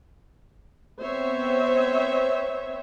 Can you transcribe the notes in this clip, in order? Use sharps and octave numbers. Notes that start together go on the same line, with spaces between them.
B3 C4 C5 C#5 E5